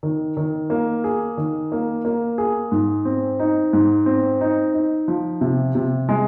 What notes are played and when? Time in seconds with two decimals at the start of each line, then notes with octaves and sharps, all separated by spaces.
0.03 D#3
0.37 D#3
0.70 A#3
1.04 G#4
1.37 D#3
1.72 A#3
2.05 A#3
2.38 G#4
2.72 G#2
3.05 C4
3.39 D#4
3.73 G#2
4.06 C4
4.41 D#4
4.74 D#4
5.08 F3
5.41 C3
5.75 C3
6.09 G#3